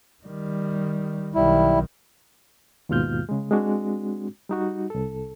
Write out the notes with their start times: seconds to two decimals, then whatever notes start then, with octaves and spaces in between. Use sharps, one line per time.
0.24 D#3 G3
1.35 B1 D#3 G3 E4
2.89 D#2 G#2 B2 F4 F6 G6
3.29 C#3 G#3
3.51 G#3 C4 D4 F#4
4.49 G3 D#4 F#4
4.90 C2 A4